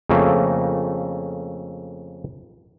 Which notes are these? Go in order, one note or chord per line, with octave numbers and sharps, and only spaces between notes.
F2 C#3 A3 A#3